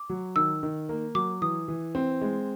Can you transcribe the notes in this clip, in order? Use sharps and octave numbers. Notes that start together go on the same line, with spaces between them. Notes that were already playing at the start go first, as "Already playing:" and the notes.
Already playing: D6
F#3
D#3 E6
D#3
A#3
F#3 D6
E3 D#6
E3
C4
G#3